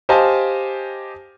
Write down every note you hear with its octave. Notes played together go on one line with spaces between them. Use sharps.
G4 C5 D#5 F5 G#5 A5